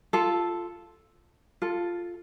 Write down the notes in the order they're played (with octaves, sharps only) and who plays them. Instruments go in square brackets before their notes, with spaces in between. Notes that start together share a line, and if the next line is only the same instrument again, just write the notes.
[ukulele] F4 A4
F4 A4